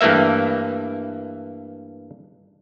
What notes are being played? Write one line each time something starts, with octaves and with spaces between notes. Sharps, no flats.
G2 E3 A3 A#3 E5